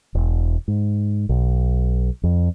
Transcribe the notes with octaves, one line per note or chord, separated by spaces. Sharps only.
E1
G#2
B1
F2